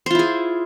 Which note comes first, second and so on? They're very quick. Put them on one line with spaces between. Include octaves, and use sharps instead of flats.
C5 F4 E4 G#4